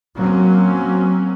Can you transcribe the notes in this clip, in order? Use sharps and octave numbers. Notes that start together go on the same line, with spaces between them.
F#3 A#3 C4 C#4